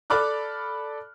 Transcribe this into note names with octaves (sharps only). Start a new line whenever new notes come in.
A4 D5 B5 D6 F6 F#6